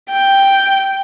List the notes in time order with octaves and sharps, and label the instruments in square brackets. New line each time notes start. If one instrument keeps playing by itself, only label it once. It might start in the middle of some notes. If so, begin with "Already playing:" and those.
[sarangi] G5